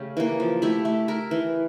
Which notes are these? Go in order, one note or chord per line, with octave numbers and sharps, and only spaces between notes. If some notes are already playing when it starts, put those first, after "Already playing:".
Already playing: C#3 A3 C#4 G4
E3 A#3
F3
A3 E4 G4
A3
E4 A#4
E3